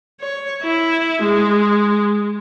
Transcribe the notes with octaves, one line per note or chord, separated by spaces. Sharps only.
C#5
E4
G#3